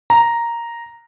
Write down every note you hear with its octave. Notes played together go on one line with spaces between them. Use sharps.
A#5